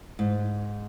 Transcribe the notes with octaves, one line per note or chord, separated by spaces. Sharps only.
G#2